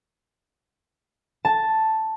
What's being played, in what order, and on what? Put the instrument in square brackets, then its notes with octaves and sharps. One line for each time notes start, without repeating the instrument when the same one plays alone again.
[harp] A5